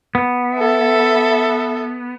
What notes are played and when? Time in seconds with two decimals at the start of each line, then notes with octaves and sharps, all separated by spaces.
0.15 B3
0.56 A4 E5